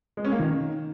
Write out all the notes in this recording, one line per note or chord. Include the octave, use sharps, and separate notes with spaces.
G#3
C#4
A#3
D#3